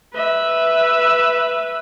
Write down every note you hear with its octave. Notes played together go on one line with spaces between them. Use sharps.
B4 E5